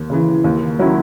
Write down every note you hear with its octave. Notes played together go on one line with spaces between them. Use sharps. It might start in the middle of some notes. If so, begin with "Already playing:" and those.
Already playing: D#2
C#3 E3
D#2
D#3 F#3 C#4 E4